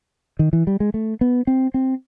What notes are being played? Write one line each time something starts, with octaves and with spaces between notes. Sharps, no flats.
D#3
E3
G3
G#3
A3
B3
C4
C4